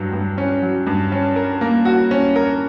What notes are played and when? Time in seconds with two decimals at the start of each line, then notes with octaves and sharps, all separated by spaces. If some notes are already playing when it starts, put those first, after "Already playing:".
Already playing: G2 F#3
0.13 G2
0.38 C#4
0.62 F#3
0.87 G2
1.12 C#4
1.36 A#4
1.61 A#3
1.85 F#4
2.11 C#4
2.36 A#4